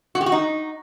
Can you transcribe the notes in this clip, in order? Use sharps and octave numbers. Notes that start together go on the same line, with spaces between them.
F#4
G4
F#4
D#4